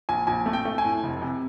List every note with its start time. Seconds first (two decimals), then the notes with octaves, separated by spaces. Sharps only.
0.09 A#1 G#5
0.27 A#1 G#5
0.46 A3
0.53 G5
0.65 A3
0.78 G#5
0.85 A2
1.03 F1
1.22 C3